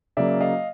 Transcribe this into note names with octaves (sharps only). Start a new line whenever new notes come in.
C#3 F#3 A#3 D5 E5
D#5 F5